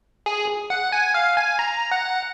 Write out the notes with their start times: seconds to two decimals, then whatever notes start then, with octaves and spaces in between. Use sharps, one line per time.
0.26 G#4
0.70 F#5
0.92 G#5
1.14 F5
1.37 G#5
1.59 A#5
1.91 F#5